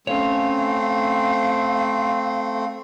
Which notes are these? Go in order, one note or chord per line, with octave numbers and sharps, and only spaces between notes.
A3 C4 C#4 C#5 F5